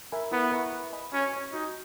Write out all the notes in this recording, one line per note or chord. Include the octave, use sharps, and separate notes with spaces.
A#4 E5 G#5 B5
B3 E4
B4 E5 A#5 C#6
B4
D#5 G#5 B5
C#4 F#4
C#5 G#5 C#6
D#4 F#4